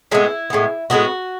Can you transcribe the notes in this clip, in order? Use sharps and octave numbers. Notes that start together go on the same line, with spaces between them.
A2 G#3 B3 E4
A2 G#3 B3
A2 G#3 B3 F#4